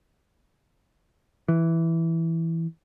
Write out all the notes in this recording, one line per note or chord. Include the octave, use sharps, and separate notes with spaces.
E3